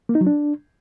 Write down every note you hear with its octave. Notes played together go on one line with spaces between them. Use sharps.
A#3
D#4
F#3
D4